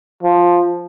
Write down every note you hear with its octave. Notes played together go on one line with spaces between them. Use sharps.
F3